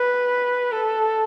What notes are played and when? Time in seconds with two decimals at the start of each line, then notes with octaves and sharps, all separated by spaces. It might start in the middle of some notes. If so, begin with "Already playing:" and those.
Already playing: B4
0.72 A4